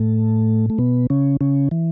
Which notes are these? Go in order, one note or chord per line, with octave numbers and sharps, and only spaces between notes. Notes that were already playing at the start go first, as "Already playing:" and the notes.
Already playing: A2 A3
A3
B2 B3
C#3 C#4
C#3 C#4
E3